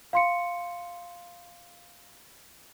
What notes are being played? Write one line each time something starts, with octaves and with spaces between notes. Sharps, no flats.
F5 C6 C#7